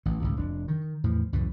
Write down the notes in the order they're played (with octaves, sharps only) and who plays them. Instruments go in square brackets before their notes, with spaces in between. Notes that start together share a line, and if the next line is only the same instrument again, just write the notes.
[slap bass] A1 E3
G#1 C#2 A2
F1 D4
D#3
E2 A2 E3 F3
C#2 F#2 A2 E3